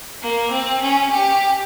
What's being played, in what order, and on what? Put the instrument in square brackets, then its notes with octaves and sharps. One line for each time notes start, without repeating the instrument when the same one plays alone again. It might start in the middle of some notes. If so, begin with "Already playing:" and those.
[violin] A#3
C4
C#4
G4